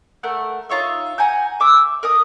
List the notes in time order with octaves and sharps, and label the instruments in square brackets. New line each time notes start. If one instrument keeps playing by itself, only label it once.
[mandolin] A3 A#4 F#5
D#4 F4 C#5 E5
F#5 G#5 A#5 G6
E5 D6 E6
A#4 D#5 D#6